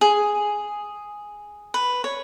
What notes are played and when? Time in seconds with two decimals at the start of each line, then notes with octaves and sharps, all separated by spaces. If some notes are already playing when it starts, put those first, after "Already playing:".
0.01 G#4
1.74 B4
2.04 C#5